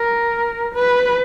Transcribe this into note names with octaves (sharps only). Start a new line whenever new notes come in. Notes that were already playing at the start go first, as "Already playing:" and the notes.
Already playing: A#4
B4